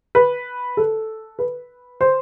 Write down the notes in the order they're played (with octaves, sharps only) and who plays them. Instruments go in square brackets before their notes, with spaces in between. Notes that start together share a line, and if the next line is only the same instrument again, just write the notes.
[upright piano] B4
A4
B4
C5